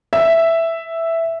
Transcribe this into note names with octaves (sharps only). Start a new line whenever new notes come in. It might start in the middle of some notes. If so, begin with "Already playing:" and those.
E5